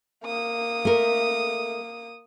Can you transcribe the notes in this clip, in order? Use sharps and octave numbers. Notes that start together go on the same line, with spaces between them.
A#3 D#6
A3 A#4